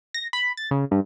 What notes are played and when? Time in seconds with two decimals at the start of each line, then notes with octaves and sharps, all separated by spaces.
0.14 A#6
0.33 B5
0.57 A6
0.71 C#3
0.91 G2